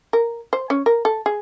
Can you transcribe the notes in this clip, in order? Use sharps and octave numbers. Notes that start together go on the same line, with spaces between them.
A#4
C5
C#4
A#4
A4
G#4